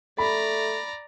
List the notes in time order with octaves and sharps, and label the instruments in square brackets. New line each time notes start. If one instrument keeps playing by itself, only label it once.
[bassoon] A3 [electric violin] D5 A#5 [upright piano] B5